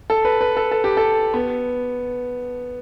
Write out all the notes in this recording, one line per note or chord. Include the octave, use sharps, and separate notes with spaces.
A4
B4
B4
A4
A4
G4
A4
B3